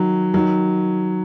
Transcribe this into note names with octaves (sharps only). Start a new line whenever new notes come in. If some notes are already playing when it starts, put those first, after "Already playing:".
Already playing: D#3 F#3
D#3 F#3